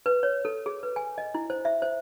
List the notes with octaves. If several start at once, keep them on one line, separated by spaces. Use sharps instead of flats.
B4
C#5
A4
G#4
B4
G#5
D#5
E4
C5
E5
C5